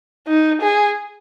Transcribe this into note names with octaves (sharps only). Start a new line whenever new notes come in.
D#4
G#4